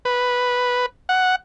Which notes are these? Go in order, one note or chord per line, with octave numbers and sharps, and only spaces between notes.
B4
F#5